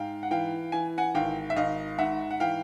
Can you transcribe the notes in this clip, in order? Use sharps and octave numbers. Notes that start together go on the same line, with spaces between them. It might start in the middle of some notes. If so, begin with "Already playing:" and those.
Already playing: G#2 F5 G5
F#5
E3 F5 G5
E3 G#5
F#5 G#5
G#1 F5 G5
E5
G#1 D#5 F5
G#2 E5 F#5
F#5
E3 F5 G5